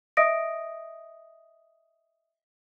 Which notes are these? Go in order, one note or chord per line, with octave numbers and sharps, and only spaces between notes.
D#5 E5 D#6 A#6 D7